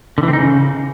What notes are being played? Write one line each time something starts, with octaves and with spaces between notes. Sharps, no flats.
D3
E3
C4
D#4
C#3